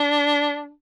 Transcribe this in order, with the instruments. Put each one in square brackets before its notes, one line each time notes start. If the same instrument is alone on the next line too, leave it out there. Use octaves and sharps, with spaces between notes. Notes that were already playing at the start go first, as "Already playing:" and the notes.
Already playing: [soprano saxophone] D4